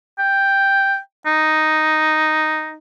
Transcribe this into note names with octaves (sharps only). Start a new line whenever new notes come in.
G5
D#4